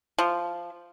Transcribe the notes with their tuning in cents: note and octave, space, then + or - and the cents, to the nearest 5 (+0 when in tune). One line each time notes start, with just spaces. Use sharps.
F3 -10